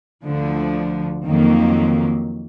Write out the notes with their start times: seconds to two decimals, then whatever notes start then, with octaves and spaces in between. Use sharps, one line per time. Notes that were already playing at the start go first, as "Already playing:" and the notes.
0.24 D2 D3 F3
1.25 F2 D#3 F#3 A#3